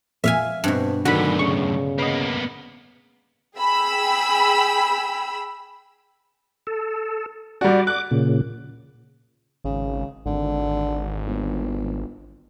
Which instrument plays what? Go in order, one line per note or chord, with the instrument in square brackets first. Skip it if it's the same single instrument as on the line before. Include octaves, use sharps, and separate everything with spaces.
[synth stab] A#1 F2 A#2 [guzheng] E5 F5 G#5
[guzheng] G2 B2 [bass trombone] C4
[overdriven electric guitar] F#2 A2 [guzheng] D3 [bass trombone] D#3 [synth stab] F#4 B5
[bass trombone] C#3 [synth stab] C#6
[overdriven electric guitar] A#3 B3 [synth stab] B4 D#5
[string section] G#4 G5 B5 E6
[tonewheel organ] A4
[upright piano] G3 F#4 [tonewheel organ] D5
[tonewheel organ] D6 [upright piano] F#6
[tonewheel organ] A#2 C#3
[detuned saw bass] G#1 [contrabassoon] C#3
[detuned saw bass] G#1 [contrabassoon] D3
[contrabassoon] G1